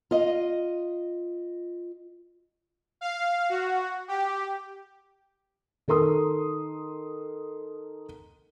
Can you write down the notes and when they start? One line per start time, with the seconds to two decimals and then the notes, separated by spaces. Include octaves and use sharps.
0.11 F4 D#5
3.01 F5
3.49 F#4
4.08 G4
5.88 D#3 A4 A#4 C6 D#6